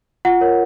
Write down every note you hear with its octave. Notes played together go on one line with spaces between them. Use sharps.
F4 F#5
A#4 C#5